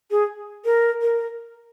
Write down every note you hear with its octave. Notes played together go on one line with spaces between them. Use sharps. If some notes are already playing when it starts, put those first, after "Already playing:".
G#4
A#4
A#4